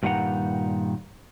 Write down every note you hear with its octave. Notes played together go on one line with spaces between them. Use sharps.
G2 A#2 D#3 G3 F#5 A#5